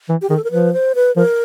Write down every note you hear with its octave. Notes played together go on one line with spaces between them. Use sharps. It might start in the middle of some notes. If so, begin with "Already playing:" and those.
E3
G4
D#3 G#4
A4
A#4
F3 B4
C5
B4
F3 A#4